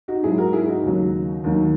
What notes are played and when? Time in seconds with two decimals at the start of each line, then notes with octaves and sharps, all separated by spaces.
0.08 D#4 F#4
0.23 G#2 F#3 E4 G#4
0.38 F#4 A#4
0.53 E4 G#4
0.68 D#4 F#4
0.83 D#2 C#3 F#3
1.44 D#2 D#3 F#3